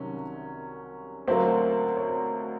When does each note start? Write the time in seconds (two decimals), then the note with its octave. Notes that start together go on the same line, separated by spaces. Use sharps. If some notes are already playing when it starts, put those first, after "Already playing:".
Already playing: C2 C3 D#3 F#3 C#4
1.28 D2 D3 F#3 A#3 C4 C5
1.97 C#5
2.09 C4 C5